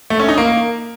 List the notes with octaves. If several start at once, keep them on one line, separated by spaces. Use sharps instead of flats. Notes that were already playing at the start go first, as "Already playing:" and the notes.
A3
C#4
D#4
A#3